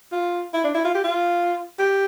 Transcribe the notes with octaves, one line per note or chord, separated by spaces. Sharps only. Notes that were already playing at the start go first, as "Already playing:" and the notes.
F4
E4
D4
E4
F4
G4
F4
G4